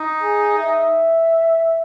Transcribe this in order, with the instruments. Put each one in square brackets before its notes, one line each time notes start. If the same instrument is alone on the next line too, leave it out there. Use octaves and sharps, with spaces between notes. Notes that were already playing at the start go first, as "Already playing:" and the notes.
Already playing: [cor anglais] D#4
[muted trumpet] G#4
E5